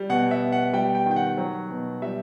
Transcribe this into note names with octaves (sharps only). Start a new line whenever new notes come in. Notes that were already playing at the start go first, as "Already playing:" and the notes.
Already playing: G3
B2 F#5
E5
B2
F#5
G3 G5
G5
D#3
G5
F#5
F#3
B2
G3 E5